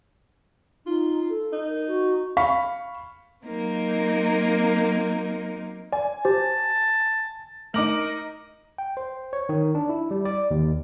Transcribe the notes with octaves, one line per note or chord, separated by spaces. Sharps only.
D#4 F4
A4
D#4
A#4
F#4
F5 B5 C#6 B6
F#3 A#3 C4 D#4 A#4
D5 G#5
G4 C5 A5
A3 D#4 A#4 D6 F#7
G5
C5
C#5
D#3
D4
E4
G3
D5
D#2